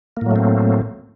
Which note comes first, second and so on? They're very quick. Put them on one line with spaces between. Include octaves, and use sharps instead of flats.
A#3 A2 F#3 A3 C4